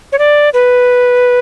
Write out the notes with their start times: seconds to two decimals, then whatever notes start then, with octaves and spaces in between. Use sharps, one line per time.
0.12 C#5
0.19 D5
0.54 B4